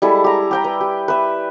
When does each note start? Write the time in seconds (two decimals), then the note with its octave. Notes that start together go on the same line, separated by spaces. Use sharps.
0.02 G3 G#3 E4 A4
0.24 G4 A#5
0.51 G4 G5 A#5
0.64 B4
0.81 G4
1.08 B4 E5